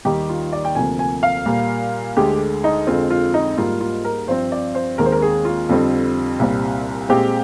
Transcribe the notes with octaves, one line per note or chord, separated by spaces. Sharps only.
D#2 D#3 G3 G4
F4
D5
G5
D2 C3 F3 A#3 G#5
G#5
F5
A#2 G3 A#3
D2 D3 G#3 G4
D#4
F2 D3 G#3 C4 F4
F4
D#4
G#2 G3 A#3 F4
F4
A#4
G2 F3 C4 C5
D5
C5
D#2 D#3 G#3 C4 A#4
C5
A#4
G#4
F4
F2 D3 G3 C4
C2 A#2 G3 C4
A#2 G#3 C4 G4